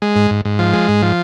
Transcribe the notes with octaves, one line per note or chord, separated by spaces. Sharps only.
G#3
G#2
G#2
G#2
F3
G#3
G#2
F3